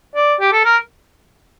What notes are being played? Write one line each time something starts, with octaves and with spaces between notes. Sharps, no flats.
D5
G4
A4
A#4